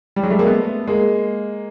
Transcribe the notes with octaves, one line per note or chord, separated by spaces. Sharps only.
G3
F#3 G#3
G3 A3
G#3 A#3
A3 B3
G#3 A#3